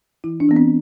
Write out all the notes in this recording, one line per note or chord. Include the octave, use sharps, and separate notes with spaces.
E3 E4
D4
E3 B3
C4